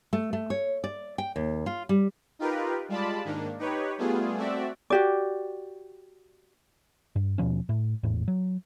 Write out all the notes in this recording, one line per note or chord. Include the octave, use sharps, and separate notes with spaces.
A3
A3
C#5
D5
G5
D#2
F4
G3
D#4 F4 G4 A#4 B4
G3 G#3 F4 D5 A5 B5
G#2 D#3 A#3 D4
D#4 G4 B4 C#5
G3 A3 B3 F4 G#4
A3 C4 F#4 D5 E5
F#4 G4 D5
G2
D#2 B2 F3 C#4
A2
G#1 E2 A2
F#3